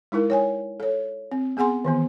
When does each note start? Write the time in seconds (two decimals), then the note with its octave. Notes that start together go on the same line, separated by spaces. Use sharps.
0.12 G#3 D#4 E4 A#4
0.30 C#5 G5 G#5
0.80 A4 C#5
1.32 C4
1.57 B3 G#4 F#5 G#5 C6
1.85 D#3 E3 B3